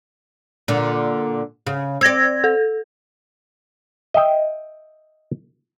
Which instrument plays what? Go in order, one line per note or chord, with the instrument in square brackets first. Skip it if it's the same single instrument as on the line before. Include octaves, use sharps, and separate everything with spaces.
[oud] A#2 D3
C#3
[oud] C4 D5 [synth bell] E6 G#6 A#6
[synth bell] A4
[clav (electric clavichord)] D#5 E5 G5